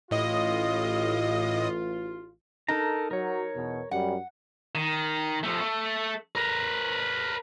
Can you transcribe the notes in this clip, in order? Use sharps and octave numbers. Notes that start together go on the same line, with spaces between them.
A1 A2 F4 D#5 D#6
D#4 A4 A#4 A#5
F#3 A#4 C#5
E2 B2
F#2 G3 F#5
D#3
F3 A3
A3
A#4 B4